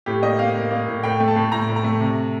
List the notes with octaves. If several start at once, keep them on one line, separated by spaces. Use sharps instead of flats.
A2 G4
A#3 D#5
A#3 F5
A#3
A#3
A2
A2 G5
A3
A5
A2
A2 A#5
A2
A#5
A3
C3